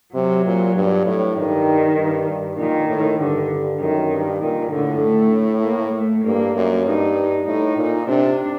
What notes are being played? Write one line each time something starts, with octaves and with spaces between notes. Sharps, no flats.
C3 F#3
A#2
G2
A2
G2 D#3
G2
G2
A#2 D#3
A2
G2 D3
F#2 D#3
G2
A#2 D#3
A2 D3
A3
A#3
A3
G2 A#3
F#2
G2 D#4
A2 D#4
A#2
C3 D4